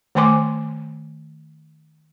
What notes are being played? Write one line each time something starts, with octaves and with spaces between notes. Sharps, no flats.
D#3 A3 C5 G#5 C6 D6